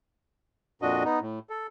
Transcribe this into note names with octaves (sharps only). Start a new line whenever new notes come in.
F2 A#2 D4 F#4 D#5
B3 D#4
A2
A4